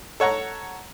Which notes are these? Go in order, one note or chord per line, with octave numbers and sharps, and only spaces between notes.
A4 C#5 F#5 A#5